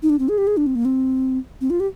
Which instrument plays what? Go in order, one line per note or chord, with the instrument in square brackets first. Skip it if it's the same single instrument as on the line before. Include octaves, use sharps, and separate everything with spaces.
[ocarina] D#4
D4
C4
G#4
G4
G#4
D4
C4
A#3
C4
C4
F4
G4